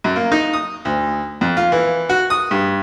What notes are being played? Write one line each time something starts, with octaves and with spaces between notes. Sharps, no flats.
F#2
A#3
D#4
D#6
D2
F2
F4
E3
F#4
D#6
G2